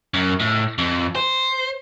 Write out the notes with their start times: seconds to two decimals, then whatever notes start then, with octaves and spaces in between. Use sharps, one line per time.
0.14 F#2
0.40 A2
0.78 F2
1.15 C5